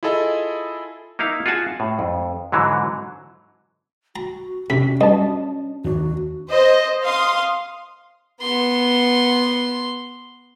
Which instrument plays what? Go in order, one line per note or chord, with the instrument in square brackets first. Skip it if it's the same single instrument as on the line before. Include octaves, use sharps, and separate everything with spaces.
[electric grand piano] E4 F4 G#4 A4 D#5
[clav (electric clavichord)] A#3 D#4 E4 F5
F4 F#4 G#4 F#5 G#5 A5
A2
F2
G#2 D3 E3 F#3
[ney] F#4 [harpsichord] A#5
[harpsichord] C3 [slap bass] C#4 D4 [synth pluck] B6
[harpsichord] G2 [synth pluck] D#5 A5
[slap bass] D#2 D4 [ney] F#4
[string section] C5 D#5
F5 C6 D#6
[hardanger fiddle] B3 C6